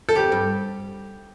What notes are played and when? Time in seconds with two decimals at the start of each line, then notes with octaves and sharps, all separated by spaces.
0.09 A4
0.15 F2 G4
0.32 G2